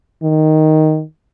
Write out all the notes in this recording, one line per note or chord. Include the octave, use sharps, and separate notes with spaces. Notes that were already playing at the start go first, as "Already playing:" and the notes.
D#3